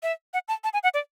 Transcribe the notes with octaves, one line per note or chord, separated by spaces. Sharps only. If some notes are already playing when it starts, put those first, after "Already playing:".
E5
F#5
A5
A5
G#5
F#5
D5